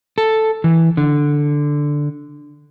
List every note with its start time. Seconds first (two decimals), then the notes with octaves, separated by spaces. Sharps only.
0.18 A4
0.64 E3
0.97 D3